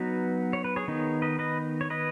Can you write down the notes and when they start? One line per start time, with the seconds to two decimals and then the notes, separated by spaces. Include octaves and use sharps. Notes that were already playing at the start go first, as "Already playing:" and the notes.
Already playing: F#3 B3 D#4 F#4 B4
0.53 C#5
0.64 B4
0.76 G#4 C#5
0.88 D#3 B3 D#4
1.22 B4 D#5
1.39 B4 D#5
1.81 C#5
1.90 B4 D#5